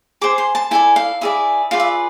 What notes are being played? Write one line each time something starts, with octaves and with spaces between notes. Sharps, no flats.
G#4 C5 D6
C6
A5
E4 A4 D5 G#5
F5
E4 G#4 D5 E5
F4 G#4 B4 D5 F5
E5